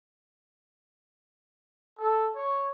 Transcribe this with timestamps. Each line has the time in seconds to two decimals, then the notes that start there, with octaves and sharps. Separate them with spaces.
1.98 A4
2.35 C#5